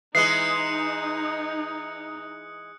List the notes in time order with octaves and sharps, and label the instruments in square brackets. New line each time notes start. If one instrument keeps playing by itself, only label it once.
[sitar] E3 G#3 [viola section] D#4 [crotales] D#6 F#6 C#7 [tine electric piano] C7